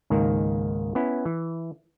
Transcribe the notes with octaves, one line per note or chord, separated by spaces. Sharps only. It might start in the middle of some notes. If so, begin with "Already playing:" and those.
C#2 G#2 D#3 A#3
B3 C#4 E4
E3